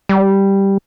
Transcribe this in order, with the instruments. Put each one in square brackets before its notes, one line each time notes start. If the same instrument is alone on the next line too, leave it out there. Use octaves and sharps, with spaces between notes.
[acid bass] G3